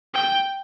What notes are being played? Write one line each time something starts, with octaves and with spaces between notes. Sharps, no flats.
G5